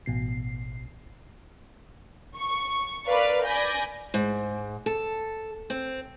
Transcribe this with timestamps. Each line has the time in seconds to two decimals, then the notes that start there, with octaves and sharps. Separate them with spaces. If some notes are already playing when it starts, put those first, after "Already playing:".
0.06 A1 B2 C7
2.37 C#6
3.07 A#4 B4 D5 F5 B5
3.46 D5 G#5 B5 G6 A#6
4.14 G#2
4.86 A4
5.70 C4